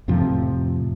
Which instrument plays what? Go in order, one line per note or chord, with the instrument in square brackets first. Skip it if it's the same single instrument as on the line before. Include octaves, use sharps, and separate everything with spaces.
[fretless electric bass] F2 A2 C3 F3